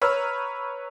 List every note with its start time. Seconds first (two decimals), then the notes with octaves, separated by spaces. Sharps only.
0.02 B4 C#5 A#5 E6 F6